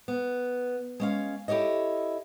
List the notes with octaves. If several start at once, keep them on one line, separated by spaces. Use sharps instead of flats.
B3
G#3 C#4 F5
E4 G4 A4 C#5 D#5